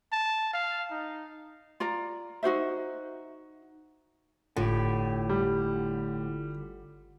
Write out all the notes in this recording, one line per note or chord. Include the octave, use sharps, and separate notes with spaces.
A5
F5
D#4
F4 D5 A#5
D#4 F#4 C5 E5
G1 A2 D3 F4 G4 F#5
G3